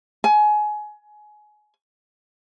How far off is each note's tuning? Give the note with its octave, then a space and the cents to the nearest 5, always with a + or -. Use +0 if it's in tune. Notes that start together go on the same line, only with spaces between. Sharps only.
G#5 +25